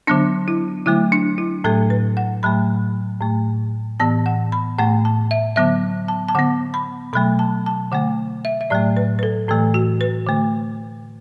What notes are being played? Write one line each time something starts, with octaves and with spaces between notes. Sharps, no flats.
D3 F#3 B3 D4
E4
D3 F#3 A3 E4
D4
E4
A2 F#3 A3 A4
B4
F#5
A2 F#3 A3 B5
A2 A3
A2 E3 B3 A5
F#5
B5
A2 A3 F#5
A5
E5
D3 F#3 B3 E5
A5
A5
D3 B3 F#5
B5
B2 F#3 A3 B5
A5
A5
D3 A3 F#5
E5
E5
A2 F#3 A3 D5
B4
B4
A4
A2 E3 A3 A4
F#4
B4
D3 A3